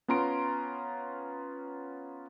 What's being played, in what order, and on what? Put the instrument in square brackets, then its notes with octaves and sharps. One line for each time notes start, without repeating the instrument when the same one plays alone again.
[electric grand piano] B3 C#4 F4 A#5 C6 D7